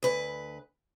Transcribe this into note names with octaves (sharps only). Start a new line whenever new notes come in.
D2 B4